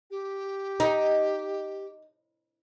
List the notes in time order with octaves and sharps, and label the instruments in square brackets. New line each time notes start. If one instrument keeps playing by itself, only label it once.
[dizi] G4
[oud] D#4